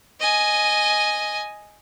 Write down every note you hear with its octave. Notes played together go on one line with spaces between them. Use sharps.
D#5 G#5